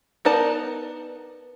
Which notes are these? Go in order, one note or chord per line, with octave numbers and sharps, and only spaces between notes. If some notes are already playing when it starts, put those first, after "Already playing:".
B3 D#4 A#4 D5 A5